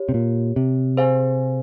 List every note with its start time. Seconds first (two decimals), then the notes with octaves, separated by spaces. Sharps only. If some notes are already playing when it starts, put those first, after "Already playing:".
Already playing: G4 C#5
0.09 C3
0.14 A#2
0.56 C3
0.97 G#4 C5 F5 G#5